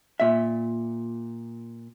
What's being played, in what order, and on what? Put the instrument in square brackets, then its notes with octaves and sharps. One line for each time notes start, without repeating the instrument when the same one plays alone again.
[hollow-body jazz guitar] A#2 E5